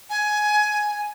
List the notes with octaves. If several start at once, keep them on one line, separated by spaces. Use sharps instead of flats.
G#5